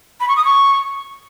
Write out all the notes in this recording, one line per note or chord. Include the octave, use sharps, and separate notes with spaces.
B5
C#6
D#6
C#6